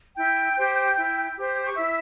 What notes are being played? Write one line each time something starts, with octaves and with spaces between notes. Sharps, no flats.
E4 G5 G6
G4 C5
E4
G4 C5
C#6
E4 E5 E6